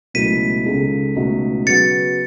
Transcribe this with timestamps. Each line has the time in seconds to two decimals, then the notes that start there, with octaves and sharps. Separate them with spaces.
0.14 C#2 B2 F#3 A3 E4 B6 D#7
0.66 C#2 C#3 G#3 D#4 A4
1.16 C#2 B2 A3 D#4 F#4
1.67 C#3 F#3 B3 F#4 A6 C#7